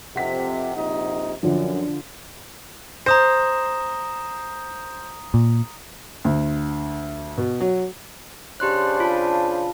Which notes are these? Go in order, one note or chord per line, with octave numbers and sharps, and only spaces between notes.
F2 C3 F#5 B6
A#1 C3 D#4
F#2 D3 F3
C5 A#5 D#6 A#6
A#2
D2
B2
F#3
C#3 D4 G4 C5 C6 F#6
F4 F5 A5